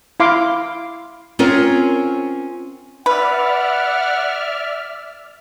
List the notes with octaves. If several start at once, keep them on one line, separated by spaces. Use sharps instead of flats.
E4 F5 C6 D6
C4 C#4 F4 G#4 A#4 C#5
B4 D5 E5 F#5 F6